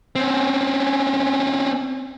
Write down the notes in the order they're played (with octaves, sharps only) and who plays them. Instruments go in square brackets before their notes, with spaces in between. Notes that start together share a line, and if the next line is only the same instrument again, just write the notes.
[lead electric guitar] C4 C#4